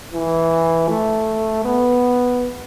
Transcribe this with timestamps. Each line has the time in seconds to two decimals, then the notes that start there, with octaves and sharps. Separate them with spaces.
0.14 E3
0.89 A3
1.65 B3